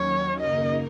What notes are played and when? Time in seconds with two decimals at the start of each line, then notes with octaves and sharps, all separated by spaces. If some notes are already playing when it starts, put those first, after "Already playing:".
Already playing: D#2 D#3 F#3 C#4 C#5
0.39 F#2 C#3 A#3 D#4 A#4 D#5